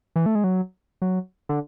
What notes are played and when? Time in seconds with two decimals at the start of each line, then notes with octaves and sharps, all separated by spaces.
0.16 E3
0.26 A3
0.35 G#3
0.44 F#3
1.02 F#3
1.49 D3